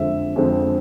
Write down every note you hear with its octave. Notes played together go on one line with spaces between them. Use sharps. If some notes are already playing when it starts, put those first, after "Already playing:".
Already playing: F2 D3 G#3 C4 E5
F2 D3 G#3 C4